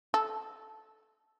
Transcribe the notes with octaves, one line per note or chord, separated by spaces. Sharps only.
A4